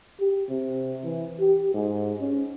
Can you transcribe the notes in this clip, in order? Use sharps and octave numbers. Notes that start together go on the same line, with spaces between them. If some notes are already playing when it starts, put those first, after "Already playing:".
G4
C3
E3
G4
G#2
C#4